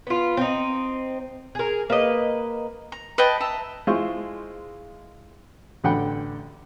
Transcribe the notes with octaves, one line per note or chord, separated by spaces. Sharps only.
B3 F4
C4 D#4
G#4 A#4
A#3 B4 D#5
A#5
B4 D#5 G5 A5
E5 A5 A#5
G#3 E4 F4 C5 C#6
A1 D3 F#5 G5 B5